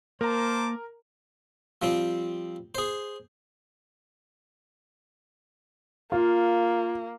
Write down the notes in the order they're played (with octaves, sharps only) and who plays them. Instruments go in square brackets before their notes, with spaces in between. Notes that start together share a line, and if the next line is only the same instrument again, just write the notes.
[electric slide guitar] A#3 [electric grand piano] A#4 A#5 [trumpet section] C5 A5 D6
[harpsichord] F3 G3 C4
G#4 C5
[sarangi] A#3 [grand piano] F4